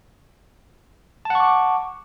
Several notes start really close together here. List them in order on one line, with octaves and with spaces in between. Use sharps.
A5 F#5 C#6 D6